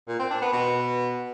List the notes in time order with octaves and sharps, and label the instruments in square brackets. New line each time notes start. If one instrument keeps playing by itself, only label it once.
[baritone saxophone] A#2
C4
D4
B3
B2